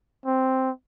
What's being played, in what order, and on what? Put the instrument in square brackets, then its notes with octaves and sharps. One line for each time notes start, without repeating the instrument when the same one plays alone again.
[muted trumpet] C4